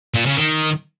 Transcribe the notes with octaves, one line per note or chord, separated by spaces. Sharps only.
A#2
C#3
D#3